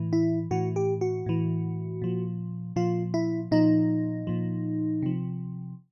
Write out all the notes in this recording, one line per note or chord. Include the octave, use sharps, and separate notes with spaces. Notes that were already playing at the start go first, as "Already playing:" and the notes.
Already playing: A2 E3
E4
A2 E3 F#4
G4
F#4
A2 E3
A#2 F3
A#2 F3 F4
E4
A#2 F3 D#4
A#2 F3
C3 F3